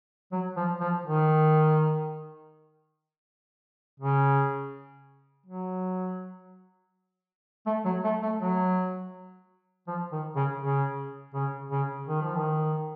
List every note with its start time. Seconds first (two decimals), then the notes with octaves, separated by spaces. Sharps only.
0.32 F#3
0.56 F3
0.80 F3
1.05 D#3
4.00 C#3
5.46 F#3
7.66 A3
7.85 F#3
8.04 A3
8.22 A3
8.40 F#3
9.88 F3
10.12 D#3
10.36 C#3
10.61 C#3
11.34 C#3
11.71 C#3
12.08 D#3
12.21 F3
12.36 D#3